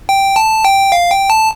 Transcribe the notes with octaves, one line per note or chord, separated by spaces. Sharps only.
G5
A5
G5
F5
G5
A5